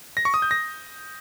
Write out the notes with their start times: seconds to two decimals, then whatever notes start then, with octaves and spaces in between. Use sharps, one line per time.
0.17 A#6
0.25 C#6
0.34 D#6
0.42 G6
0.51 A#6